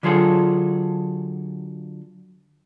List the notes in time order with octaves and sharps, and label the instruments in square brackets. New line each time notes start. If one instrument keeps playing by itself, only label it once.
[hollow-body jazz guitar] D3 F#3 F4 G#4 A4